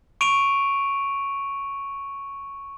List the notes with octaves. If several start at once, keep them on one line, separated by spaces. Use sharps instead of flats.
C#6 D7 D#7 F7